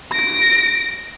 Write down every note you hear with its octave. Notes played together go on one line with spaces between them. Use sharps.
A#6 D7